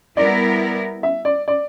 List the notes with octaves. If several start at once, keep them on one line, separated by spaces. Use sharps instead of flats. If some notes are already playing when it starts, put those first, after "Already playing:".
G3 B3 E4 A#4 D5
E5
D5
D5